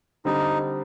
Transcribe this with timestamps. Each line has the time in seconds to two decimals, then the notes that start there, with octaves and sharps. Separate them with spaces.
0.25 D3 G3 C4 D#4